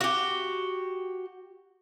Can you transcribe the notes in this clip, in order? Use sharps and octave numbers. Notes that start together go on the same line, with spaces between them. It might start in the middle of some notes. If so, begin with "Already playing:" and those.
F#4 G4